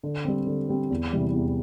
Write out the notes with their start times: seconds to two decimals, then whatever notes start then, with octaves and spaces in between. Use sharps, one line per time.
0.03 D3
0.25 G3 C4
0.47 D3
0.69 G3 C4
0.90 E2
1.13 C3 E3 G3
1.33 E2